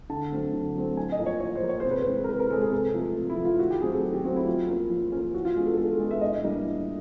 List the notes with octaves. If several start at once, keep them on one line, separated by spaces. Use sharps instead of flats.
D3 A5
F#3 A3 C4
D3
F#3 A3 C4
A2 G#5
D#5
F3 A#3
C#5
A2 C#5
C5
F3 A#3
C#5
C3 C5
B4
E3 G#3 C4 C5
A#4
C3 B4
A#4
E3 G#3 C4 A4
G#4
C3 A4
F3 A3
C3
E4
F3 A3
F4
D#3 F#4
G4
F#3 A3 C4 G#4
A4
D#3 G#4
G4
F#3 A3 C4 F#4
E4
F3 F4
A#3 C#4
F3
A#3 C#4
E3 F#4
F4
G#3 B3 D4
A4
E3 A4
G#3 B3 D4
E5
A2 D#5
E3 G3 A#3 D4
A2